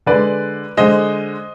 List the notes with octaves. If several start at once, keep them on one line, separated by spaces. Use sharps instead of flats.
D3 G#3 B4 D5
D3 G#3 C5 D#5